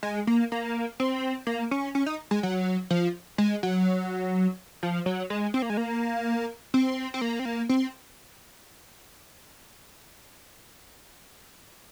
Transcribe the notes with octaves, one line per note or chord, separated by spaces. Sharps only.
G#3
A#3
A#3
C4
A#3
C#4
C#4
D#4
G#3
F#3
F3
G#3
F#3
F3
F#3
G#3
C4
A#3
G#3
A#3
C4
C4
A#3
C4
A#3
C4